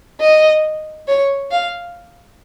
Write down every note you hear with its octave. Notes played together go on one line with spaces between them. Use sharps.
D#5
C#5
F5